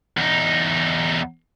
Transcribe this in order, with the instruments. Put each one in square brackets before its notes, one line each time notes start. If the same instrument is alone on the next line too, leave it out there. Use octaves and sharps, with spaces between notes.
[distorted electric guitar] E2 D#4